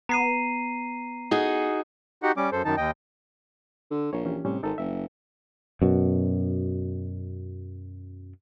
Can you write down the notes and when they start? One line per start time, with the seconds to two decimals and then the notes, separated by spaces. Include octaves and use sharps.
0.09 B3 A#5 C7 D#7
1.31 D#4 F#4 G#4
2.23 D#4 F#4 G4 F#5
2.37 G3 C#4 D6
2.52 F#2 A4 C5
2.65 F#2 D#3 D#4 A5
2.77 D#2 D#5 G5
3.91 D3
4.13 A#1 C#5
4.25 E3 C#4 G4
4.45 A2 C3 G3 C#4
4.63 G#1 D#4 A4
4.78 F#1 E5
5.82 F#2 B2